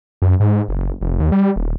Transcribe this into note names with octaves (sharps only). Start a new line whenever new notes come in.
F#2
G#2
F#1
F1
D#2
G3
D#1